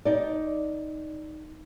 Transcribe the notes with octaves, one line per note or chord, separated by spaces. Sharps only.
D#4 D5